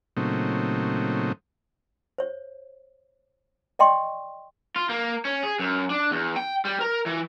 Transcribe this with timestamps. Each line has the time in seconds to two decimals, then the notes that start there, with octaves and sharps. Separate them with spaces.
0.17 A#2 C#3 F#3 A3 C4 D#4
2.18 C5 C#5
3.79 D5 D#5 G5 C6 C#6
4.76 F4
4.90 A#3
5.25 C#4
5.44 G#4
5.59 F#2
5.90 D4
6.11 E2
6.36 G5
6.65 G3
6.81 A#4
7.06 E3